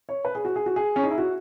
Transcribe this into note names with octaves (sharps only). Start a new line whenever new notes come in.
C#5
B4
G#4
F#4
G#4
F#4
G#4
C#4
D#4
E4
F#4